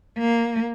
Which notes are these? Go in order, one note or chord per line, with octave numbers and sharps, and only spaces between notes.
A#3